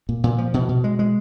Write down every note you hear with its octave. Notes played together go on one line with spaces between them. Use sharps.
A#2
A#2
F3
B2
B2
G#3
G#3